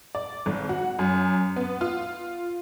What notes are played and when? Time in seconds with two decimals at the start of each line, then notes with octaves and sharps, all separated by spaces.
0.15 D5
0.46 G#1
0.69 F#4
0.99 F#2
1.56 B3
1.81 F4